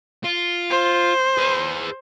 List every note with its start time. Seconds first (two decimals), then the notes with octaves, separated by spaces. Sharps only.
0.25 F4
0.71 C5
1.38 G#4 B4